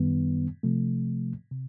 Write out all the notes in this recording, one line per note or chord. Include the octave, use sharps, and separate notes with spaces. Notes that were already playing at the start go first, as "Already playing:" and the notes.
Already playing: F#2 D#3 G3 B3
C3 F3 A3
C3